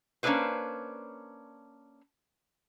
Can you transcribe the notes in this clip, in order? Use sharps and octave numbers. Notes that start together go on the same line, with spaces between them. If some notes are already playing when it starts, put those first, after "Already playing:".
A#3 C#4 D4 E4 B4 C5